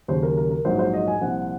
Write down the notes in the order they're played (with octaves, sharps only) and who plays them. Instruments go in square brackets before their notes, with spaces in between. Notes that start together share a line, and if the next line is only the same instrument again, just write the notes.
[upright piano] D#2 C#3 F#3 C5
A#4
A#4
A#4
A#1 G#2 F#3 C5
C5
D#5
G#5
C2 A#2 F3 F#5